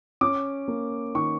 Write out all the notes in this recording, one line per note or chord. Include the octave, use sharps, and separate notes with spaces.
C#4 D6
A#3
D#3 C#6